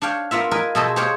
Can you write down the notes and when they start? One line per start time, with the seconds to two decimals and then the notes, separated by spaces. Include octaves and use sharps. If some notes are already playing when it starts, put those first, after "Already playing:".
0.02 D4 C#5 F5 G5
0.31 A#3 B3 F4 E5
0.51 A#4 B4 D#5 G#5
0.75 B2 G#4 A4 C5 D#5 A5
0.96 G4 G#4 C5 C#5 F5 G5